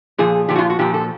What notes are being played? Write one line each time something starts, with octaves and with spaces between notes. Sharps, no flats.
A#2 F3 G#4
A#2 F3 G4
F#4
F4
F#4
A#2 F3 G4
A4